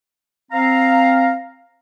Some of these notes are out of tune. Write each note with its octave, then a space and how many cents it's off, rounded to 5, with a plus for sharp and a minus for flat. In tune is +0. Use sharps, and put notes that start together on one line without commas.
C4 +0 F5 +0 A#5 -5